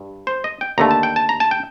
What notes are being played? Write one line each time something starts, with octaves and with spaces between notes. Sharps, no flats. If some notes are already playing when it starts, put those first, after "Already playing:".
Already playing: G2
C5
D#5
G5
D#2 D3 A3 A#5
A5
G5
A5
A#5
A5
G5